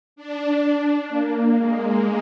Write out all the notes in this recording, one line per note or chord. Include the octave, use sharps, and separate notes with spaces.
D4
A#3
G#3